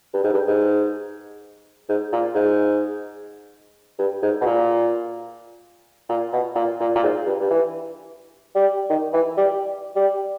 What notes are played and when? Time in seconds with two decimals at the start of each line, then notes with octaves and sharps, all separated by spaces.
0.14 G2
0.24 G#2
0.33 G2
0.48 G#2
1.89 G#2
2.12 A#2
2.35 G#2
3.99 G2
4.23 G#2
4.41 B2
4.46 A#2
6.09 A#2
6.33 B2
6.56 A#2
6.80 A#2
6.95 A#2
7.03 G#2
7.26 G2
7.40 G2
7.50 E3
8.55 G3
8.89 D#3
9.13 E3
9.37 G3
9.96 G3